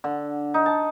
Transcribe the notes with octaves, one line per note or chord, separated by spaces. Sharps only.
D3
D#4
A5